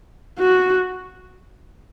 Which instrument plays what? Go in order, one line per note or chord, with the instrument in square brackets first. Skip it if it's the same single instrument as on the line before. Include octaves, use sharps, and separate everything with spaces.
[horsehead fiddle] F#4